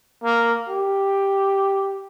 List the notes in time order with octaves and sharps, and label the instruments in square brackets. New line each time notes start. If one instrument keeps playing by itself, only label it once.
[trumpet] A#3
G4